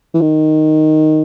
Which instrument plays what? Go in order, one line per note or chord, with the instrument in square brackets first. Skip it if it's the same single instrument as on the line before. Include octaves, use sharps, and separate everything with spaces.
[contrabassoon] E3
D#3